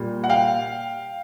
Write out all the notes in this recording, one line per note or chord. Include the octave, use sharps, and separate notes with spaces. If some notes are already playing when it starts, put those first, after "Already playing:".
Already playing: A#2 G3
F#5
F5 G5